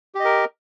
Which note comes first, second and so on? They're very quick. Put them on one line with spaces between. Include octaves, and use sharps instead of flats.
G4 D#5 A#4